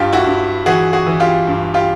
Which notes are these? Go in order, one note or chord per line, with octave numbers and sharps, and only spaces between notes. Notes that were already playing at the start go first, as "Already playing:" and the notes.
Already playing: G2 F4 G4
E4 F#4
G2
E3 F#4 G#4
F#4 G#4
E3
F4 G4
G2
F4 G4